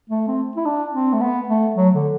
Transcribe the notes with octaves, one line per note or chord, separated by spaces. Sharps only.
A3
C4
E4
D4
C4
A3
B3
A3
F#3
D3